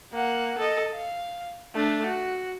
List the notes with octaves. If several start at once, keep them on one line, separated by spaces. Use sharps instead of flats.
A#3 F#5
A4 D#5
F5
A3 D4
F#4